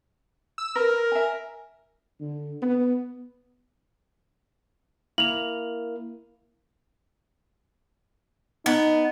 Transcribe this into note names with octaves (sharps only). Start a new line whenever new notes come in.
E6
A#4 B4
E5 G#5
D3
B3
A#3 E4 A#4 F7 F#7
B3 D#4